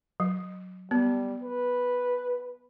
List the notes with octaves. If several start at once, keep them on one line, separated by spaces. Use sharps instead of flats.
F#3
G3 B3
B4